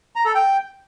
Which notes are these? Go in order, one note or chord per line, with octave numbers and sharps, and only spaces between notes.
A#5
A4
G5